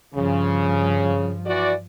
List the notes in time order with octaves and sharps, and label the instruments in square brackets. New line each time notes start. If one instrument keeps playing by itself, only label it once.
[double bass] G2 F3 [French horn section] C#3
[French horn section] E3 F#4 D5